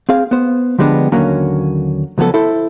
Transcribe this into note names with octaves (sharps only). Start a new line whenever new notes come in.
C4 G#4 F5
B3 C5
D3 F3 G3 G#3 B3 D4
D#2 D3 F#3 A#3 C#4
C#2 F3 F#3 B3 A4
E4 A4 C5